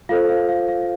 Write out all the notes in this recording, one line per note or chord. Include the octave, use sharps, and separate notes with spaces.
F4 A4 C5 F5
F5
F5
F5